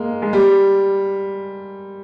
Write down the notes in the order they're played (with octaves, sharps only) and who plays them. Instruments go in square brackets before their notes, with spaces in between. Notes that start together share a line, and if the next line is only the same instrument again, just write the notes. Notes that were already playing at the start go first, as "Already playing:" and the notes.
Already playing: [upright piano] G#3 A#3
G#3
G3